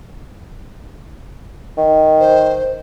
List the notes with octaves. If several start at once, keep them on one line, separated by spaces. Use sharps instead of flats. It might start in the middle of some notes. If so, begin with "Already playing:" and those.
D#3
C5